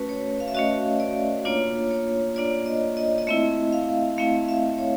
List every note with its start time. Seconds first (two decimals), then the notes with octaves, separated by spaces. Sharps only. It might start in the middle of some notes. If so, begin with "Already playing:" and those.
Already playing: A3 C#4 F#4 B4
0.09 C#5
0.40 F5
0.48 E5
0.55 A3 C#4 F#4 D#5
1.00 D5
1.45 A#3 D4 F4 C#5
1.91 C#5
2.36 A#3 D4 F4 D5
2.66 D#5
2.97 D#5
3.18 D#5
3.27 A3 C4 E4 E5
3.73 F5
4.18 A3 C4 E4 F5
4.48 E5
4.78 C#5